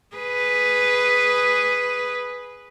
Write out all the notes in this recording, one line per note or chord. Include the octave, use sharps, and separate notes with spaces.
G#4 B4